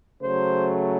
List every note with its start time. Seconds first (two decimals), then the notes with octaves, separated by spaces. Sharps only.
0.20 C#3 F#3 A3 C5